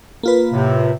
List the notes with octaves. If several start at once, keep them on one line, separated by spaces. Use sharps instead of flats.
A#3 F4 B4
A2 C3